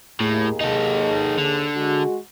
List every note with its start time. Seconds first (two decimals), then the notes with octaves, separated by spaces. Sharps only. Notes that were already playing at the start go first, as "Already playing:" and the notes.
0.20 D#2 A2 G#4
0.61 D#4 A4
1.37 D3
1.76 G#3 F#4